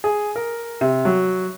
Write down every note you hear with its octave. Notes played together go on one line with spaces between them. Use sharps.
G#4
A#4
C3
F#3